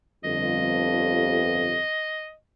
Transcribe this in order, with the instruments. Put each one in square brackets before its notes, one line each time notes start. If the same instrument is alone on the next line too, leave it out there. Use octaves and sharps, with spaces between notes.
[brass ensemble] G1 F2 [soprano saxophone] D#5